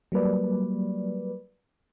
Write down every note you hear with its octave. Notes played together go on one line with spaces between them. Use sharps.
F#3 G3 A#3 B4 D5